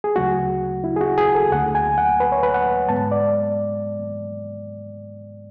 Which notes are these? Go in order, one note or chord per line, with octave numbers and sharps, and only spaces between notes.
G#4
D2 C#3 F#3 A3 F#4
E4
G#4
F#4
G#4
A4
D2 D3 A3 F#5
G#5
F#5
B4
C#5
B4
F#5
G#2 G#3 B3 A5
D5